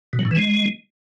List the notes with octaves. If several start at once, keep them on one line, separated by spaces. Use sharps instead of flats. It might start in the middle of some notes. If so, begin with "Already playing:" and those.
B2
F#3
A2
E3
G#3